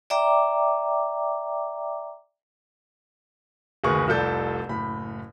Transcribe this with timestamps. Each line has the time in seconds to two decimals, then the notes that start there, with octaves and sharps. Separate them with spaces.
0.10 D5 E5 G5 A#5 D6
3.84 F#1 D2 D#3 G#4 B4 C#6
4.08 F1 C2 F3 A4 D5 G6
4.69 F#1 A2 B5